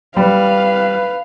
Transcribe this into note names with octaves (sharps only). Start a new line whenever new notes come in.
G3 B4 F5